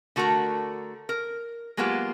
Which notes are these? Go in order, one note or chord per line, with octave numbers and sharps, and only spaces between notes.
D3 A3 F#4 A#4 A#5
A#4
F#3 G#3 A#3 B3 F4 G4